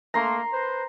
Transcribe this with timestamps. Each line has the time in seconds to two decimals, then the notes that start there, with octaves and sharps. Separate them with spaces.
0.14 A3 A#3 A#5 C6
0.52 B4 C5